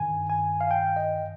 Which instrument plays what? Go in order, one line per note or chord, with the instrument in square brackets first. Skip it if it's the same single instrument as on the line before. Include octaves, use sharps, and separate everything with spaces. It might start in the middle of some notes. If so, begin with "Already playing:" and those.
Already playing: [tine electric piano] G2 D#3 G#5
G#5
F5
G5
D#5